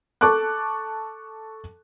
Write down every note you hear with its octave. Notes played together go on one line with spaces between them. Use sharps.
A4 A5 C#6 D6 F#6